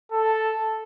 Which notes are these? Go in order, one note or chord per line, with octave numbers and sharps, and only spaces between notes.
A4